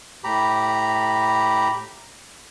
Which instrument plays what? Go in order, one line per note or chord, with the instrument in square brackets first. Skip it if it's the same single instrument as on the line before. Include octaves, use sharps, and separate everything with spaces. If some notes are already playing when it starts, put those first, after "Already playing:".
[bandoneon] A2 G4 A#5 B5